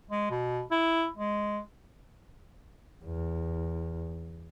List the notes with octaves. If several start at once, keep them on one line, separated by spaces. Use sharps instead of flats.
G#3
B2
E4
G#3
E2